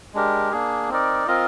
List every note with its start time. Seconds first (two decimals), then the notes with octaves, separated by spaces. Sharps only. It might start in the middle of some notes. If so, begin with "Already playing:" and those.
0.14 G#3 D4 G4 A#4
0.52 A#3 D4 G#4
0.89 C4 D#4 A#4 D5
1.27 C4 F4 A#4 D#5